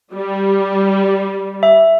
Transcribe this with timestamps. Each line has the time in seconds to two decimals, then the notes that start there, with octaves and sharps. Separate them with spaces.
0.12 G3
1.63 E5